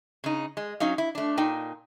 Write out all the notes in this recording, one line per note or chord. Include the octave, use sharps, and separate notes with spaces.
C#3 D#4
G#3
F#3 C#4 D#4 F5
E4
A3 D4
A#2 D#4 G5